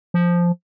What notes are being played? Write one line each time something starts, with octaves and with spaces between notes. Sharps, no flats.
F3